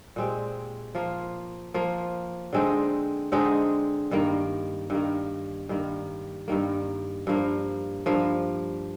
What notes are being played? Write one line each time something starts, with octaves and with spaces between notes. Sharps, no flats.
A#2 G#3 C4 G4
F3 A#3 F4
F3 A#3 F4
D3 G#3 C4 D#4
D3 G#3 C4 D#4
G2 D#3 A#3
G2 D#3 A#3
G2 D#3 A#3
G2 D#3 A#3
G2 F3 A#3
G2 F3 A#3